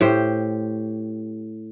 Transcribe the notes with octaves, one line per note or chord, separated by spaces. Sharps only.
A2 G4 C5